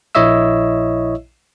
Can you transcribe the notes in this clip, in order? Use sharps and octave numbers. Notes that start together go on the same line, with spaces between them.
A#1 E4 C#5 D#5 E5 E6